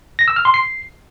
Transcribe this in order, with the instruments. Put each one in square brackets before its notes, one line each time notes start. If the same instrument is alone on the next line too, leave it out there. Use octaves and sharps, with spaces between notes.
[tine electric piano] A#6
E6
F6
C6
C7